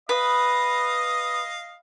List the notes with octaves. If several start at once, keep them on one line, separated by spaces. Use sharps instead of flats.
B4 D#5 F5 D#6